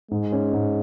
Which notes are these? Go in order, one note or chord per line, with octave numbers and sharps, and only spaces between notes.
G#2 G#3
C#4
G#2